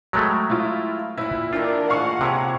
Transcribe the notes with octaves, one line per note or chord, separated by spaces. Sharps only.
F#3 G#3 A3 A#4 B4 G5
E4 F4
A#2 E4 B4
D#3 E3 D4 F4 G4 A#4
A#2 G#3 F5 F#5 C#6
C3 F3 E4 C#5